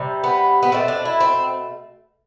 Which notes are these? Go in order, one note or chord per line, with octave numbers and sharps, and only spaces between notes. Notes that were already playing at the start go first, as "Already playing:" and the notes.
Already playing: C3 G3
B3
B3
B2 A3 C4
D4
E4
C4